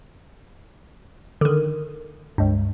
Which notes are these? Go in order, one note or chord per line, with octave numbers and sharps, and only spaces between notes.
D3 D#3
C#2 G2